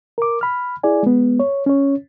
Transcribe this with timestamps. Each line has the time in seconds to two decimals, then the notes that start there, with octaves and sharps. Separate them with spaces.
0.18 A#4 D6
0.41 B5 F6
0.83 E4 G#4 D5 G#5
1.03 G#3 B3
1.40 C#5
1.66 C#4 C#5